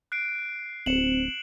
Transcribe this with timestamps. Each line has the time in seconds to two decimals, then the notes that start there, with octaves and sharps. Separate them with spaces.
0.12 F#6 C7 D7
0.86 D1 C4 C#7 E7 F#7